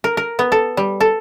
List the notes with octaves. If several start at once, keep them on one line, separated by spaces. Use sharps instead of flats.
A#4
A#4
B3
A4
G3
A4